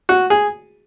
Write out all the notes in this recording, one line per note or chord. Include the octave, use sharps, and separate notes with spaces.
F#4
G#4